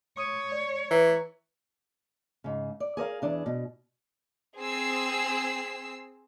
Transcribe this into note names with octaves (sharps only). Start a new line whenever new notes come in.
C#5 C#6 D#6 D#7
D5
E3 B4 A#5
G#2 C#3
D5
G#4 A#4 C#5 F5
E2 E3 D4 G#4
B2
C4 G#4 E6 C7